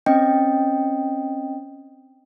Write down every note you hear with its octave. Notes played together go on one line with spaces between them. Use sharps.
C4 C#4 D#5 G5